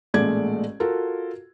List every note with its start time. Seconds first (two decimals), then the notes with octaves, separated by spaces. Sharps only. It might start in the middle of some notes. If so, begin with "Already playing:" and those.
0.14 A1 A#2 G#3 A3 D5 G#6
0.80 F4 F#4 A4 A#4